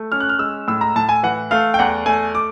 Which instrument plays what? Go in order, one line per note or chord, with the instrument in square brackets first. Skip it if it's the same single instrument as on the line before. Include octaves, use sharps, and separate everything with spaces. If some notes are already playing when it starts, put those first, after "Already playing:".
Already playing: [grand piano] A3
C#4 F6
F#6
F6
G#3 E6
A2 E6
A#5
A2 A5
G#5
E3 F#5
A3 F5
G5
E2 F#5
A3 G#5
D6